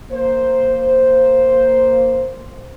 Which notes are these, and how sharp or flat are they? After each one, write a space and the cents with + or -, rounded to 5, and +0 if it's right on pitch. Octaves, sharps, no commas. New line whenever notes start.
A#3 +0 C5 +0